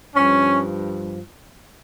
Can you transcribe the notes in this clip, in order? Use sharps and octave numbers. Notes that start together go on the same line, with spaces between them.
G2 F3 C#4